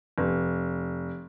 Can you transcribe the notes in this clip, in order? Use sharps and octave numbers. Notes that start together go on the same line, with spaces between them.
F1